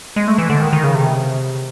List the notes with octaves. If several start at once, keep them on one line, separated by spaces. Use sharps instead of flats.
G#3
A3
E3
D3
D#3
D#3
C#3
C3